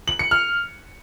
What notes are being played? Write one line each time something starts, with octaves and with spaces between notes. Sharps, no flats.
F#7
C#7
F6